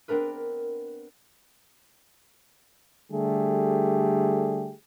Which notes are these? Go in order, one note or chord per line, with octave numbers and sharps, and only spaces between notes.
B3 C4 D4 A#4 B4
D3 G3 A3 G4 G#4